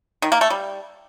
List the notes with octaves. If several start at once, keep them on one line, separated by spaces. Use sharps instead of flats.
D#3
A#3
A3
G3